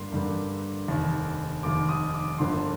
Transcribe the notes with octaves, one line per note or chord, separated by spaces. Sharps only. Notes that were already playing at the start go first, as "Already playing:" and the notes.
Already playing: G2 D3 G3 A#3 C6
G2 D3 G3 A#3
F1 D#2 D#3
F1 D#2 D#3 D6
D#6
D6
G1 G2 D3 F3 A#3 C6